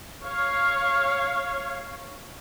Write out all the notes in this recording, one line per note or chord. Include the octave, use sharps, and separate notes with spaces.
C#5 F5